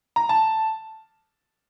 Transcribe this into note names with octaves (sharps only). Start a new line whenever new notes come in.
A#5
A5